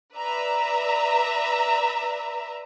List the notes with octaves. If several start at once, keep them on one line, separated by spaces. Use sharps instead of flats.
B4 D5 E5 A#5